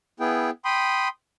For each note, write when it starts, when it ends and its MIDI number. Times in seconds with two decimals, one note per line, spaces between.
0.20 0.50 59
0.20 0.50 64
0.20 0.50 68
0.20 0.50 79
0.65 1.08 79
0.65 1.08 83
0.65 1.08 84
0.65 1.08 87